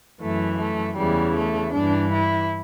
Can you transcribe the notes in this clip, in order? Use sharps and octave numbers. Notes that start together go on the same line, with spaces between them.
F#2 E3 A3
A3
E2 C#3 E3 G3
A3
G2 D4
E3
E4